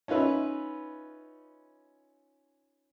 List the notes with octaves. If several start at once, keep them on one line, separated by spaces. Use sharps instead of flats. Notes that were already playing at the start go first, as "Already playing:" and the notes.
C#4 D#4 F4 B4 E5